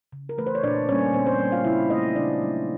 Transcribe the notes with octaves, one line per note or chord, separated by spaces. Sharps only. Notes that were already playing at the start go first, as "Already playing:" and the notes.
C#3
A#4
E3 A3 B4
C5
C#5
A#2 D4 D5
G3 A#3 C#4 C#5
A#2 C4 C5
C4 C5
G3 A#3
F4 F5
C#3 E4 E5
F#3 A3 D#4 D#5
C#3 D4 D5
F#3 A3